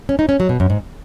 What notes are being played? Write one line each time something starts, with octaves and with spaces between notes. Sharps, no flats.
C#4
D#4
C#4
F#3
B2
F#2
G#2